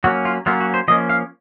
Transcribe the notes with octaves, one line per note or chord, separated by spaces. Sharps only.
F#3 A#3 C#4 F#4
F4
F#3 A#3 C#4 F4
F#4
C5
F3 A#3 C#4 D#5
F5